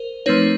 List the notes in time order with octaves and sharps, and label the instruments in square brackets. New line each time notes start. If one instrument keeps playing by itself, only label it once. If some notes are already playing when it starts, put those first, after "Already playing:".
Already playing: [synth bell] A#4 C5
F3 A3 C4 D#4 B4 C#5